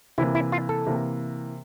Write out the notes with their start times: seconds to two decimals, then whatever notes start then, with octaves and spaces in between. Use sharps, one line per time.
0.18 C3 E3 A#3 E4
0.35 E4
0.52 F4
0.69 A4
0.87 C3 E3 A#3